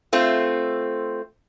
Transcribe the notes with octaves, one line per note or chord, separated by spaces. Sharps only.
A3 C4 F4